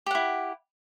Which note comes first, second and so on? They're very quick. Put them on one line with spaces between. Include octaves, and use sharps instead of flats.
G4 F#5 E4